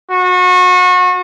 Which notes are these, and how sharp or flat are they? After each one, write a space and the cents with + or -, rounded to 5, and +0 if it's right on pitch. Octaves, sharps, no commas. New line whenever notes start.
F#4 -30